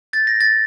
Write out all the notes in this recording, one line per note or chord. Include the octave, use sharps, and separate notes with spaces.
G6 A6
A#6
A6